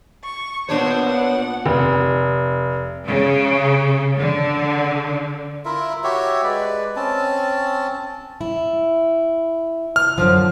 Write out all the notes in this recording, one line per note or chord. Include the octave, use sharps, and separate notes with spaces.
C#6
A#2 B3 D4 C5 C#5
F#5
F1
C#3
D3
E4 F4 A#4 E5
F#4 G4 C#5 E5
G#3 B4 D5
C4 C#4 A5
E4
F6
F#2 D3 F3